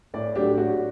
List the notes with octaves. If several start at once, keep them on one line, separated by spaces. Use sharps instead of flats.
A2 D5
F#3 A3 D4 G4
A2 F#4